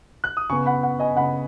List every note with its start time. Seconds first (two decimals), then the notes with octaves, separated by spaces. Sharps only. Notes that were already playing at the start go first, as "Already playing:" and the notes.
0.24 F#6
0.37 D#6
0.50 C#3 B3 G#5 C#6
0.66 F#5 B5
0.83 F#5
1.00 D#5 G#5
1.16 C#3 B3 F#5 B5